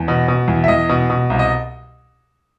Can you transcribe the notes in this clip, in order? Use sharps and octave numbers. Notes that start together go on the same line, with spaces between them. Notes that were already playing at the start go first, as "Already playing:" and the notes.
Already playing: E2
B2
B2
E2
E5
E2 D#5
B2
B2
C2
D#5